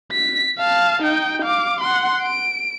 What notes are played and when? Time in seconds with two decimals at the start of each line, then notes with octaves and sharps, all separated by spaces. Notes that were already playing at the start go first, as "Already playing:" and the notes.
0.12 B6
0.59 F5 A5
1.03 D#4 G5
1.43 F5 D6
1.81 F#5 C6
2.23 D7